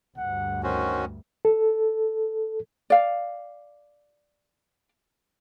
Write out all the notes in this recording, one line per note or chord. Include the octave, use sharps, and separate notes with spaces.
D2 G2 F#5
D#3 C#4 F#4 C5
A4
D5 F5